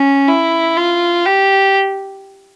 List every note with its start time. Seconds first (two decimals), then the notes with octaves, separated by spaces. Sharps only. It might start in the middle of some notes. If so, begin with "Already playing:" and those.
Already playing: C#4
0.28 E4
0.77 F4
1.25 G4